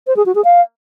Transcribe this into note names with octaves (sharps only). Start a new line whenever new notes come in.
C5
G#4
F#4
G#4
F5